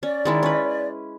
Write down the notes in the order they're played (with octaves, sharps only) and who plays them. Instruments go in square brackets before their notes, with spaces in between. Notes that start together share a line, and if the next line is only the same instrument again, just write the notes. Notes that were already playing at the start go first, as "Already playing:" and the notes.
[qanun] C#4 [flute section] D5
[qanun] D#3 G#3 E4
C#4 B4